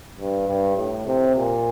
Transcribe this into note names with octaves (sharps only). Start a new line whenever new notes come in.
G2
G2
A2
C3
A#2